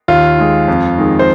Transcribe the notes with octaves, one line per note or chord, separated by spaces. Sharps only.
D#2 F4
D#3 G#3
F2
D#3 G#3
C5